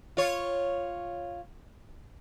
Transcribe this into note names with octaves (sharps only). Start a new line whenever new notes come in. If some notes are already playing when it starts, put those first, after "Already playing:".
F4 C#5